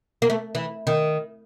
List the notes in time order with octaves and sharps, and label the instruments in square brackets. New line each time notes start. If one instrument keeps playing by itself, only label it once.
[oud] A#3
A3
E3
D#3